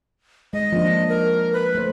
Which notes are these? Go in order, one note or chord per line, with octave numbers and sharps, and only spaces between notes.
G#3 D#5
F3 A#3 D4
A#4
B4
A3 C5